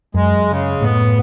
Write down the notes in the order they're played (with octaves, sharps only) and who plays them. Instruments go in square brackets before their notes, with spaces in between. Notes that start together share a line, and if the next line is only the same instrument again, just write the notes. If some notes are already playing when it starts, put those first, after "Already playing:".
[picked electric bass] F#2 [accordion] G#3
[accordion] C#3
[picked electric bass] A2 [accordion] B3